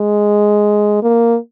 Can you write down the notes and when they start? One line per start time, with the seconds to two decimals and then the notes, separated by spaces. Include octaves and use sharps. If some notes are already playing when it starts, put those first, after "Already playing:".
Already playing: G#3
1.03 A#3